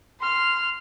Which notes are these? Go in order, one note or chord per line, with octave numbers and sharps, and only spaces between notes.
C6 F6